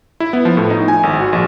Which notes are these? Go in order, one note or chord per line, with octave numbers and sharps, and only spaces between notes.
E4
B3
F3
A2
D#4
G#5
G#1
F#4
A#1